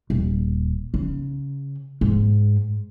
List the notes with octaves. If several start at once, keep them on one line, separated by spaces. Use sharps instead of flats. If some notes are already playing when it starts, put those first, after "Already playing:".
D#1
C#3
G#2